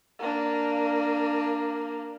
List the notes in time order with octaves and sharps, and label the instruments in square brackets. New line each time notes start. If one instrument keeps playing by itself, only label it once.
[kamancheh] A#3 D4